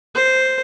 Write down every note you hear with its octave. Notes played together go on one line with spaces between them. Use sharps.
C5